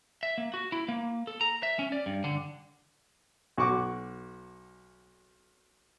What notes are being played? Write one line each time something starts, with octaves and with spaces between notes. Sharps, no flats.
E5
A#3
F#4
E4
A#3
A4
A#5
E5
C#4
D5
G2
D3
B1 F#4 F#5 C#6 D6